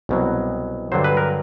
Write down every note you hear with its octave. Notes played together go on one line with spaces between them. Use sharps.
C2 B2 F#3
G2 D3 F#3 C5
B4
A#4